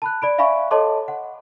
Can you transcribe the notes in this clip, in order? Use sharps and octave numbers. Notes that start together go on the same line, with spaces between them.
A5 B5 F#6
D5 B5 D7
D5 E5 F5 G#5 B5 C#6
A4 C#5 D#5 A5 C6 D6
F#5